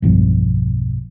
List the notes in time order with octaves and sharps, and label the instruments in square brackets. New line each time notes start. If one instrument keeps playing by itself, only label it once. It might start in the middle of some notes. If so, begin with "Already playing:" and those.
[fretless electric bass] E1 B1 G2 F3